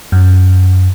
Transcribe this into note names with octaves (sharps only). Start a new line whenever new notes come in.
F#2